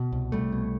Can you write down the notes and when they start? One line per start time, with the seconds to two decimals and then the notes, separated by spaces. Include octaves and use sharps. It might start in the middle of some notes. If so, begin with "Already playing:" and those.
Already playing: B2
0.12 C2
0.32 C2 G3 A3
0.52 B2